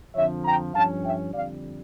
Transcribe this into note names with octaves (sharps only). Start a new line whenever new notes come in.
F2 D3 F3 C#5 E5
G5 A#5
G2 F3 C#4 F5 A5
E5 G5
F2 D3 G3 D5 F5